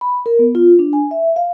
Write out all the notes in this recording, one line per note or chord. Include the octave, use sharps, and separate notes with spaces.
B5
A#4
B3
F4
D4
G#5
E5
F5